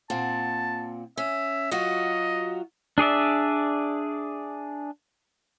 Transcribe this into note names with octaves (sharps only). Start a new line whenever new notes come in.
A#2 C4 F#5 A5
C#4 E5
F#3 F4 F#4 D#5
D4 G#4 D5 E5